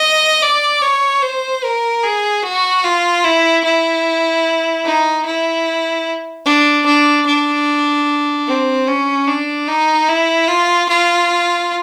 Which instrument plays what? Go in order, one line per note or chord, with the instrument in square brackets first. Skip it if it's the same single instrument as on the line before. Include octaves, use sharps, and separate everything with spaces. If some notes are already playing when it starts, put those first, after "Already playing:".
Already playing: [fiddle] D#5
D5
C#5
C5
A#4
G#4
F#4
F4
E4
E4
D#4
E4
D4
D4
D4
C4
C#4
D4
D#4
E4
F4
F4